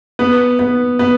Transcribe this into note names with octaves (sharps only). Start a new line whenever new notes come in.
B3
B3
B3